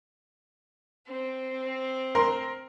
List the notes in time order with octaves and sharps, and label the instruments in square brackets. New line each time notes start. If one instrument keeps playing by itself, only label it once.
[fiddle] C4
[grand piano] A#4 C6